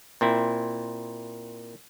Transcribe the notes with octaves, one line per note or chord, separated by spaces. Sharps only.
A#2 C4 E4